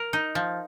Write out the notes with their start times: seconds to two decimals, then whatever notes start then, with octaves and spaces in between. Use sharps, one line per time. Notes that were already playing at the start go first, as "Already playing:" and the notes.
Already playing: A#4
0.13 D#4
0.35 F3